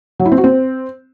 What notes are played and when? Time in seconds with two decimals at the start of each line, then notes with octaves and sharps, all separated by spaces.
0.19 F#3
0.26 E4
0.32 C4
0.38 F#4
0.44 C4